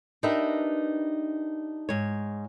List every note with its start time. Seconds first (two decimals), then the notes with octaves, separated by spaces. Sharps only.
0.23 D4 D#4 G4 A#4 B4 E5
1.89 G#2 C#5